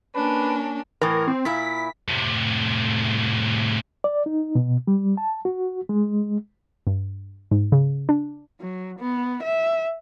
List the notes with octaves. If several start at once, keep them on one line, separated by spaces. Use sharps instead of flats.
A#3 C#4 D4 B4
A2 E3 A#4
C4
A#2 E4 B6
A2 C3
D5
D#4
B2
G3
A5
F#4
G#3
G2
G#2
C#3
D4
F#3
B3
E5